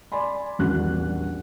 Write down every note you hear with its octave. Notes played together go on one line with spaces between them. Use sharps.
D5 G#5 B5 C6
D#1 A#1 E2 F#4 F#5 F#6